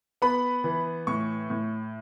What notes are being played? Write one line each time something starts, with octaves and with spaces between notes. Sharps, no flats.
B3 B5
E3
A2 C#6
A2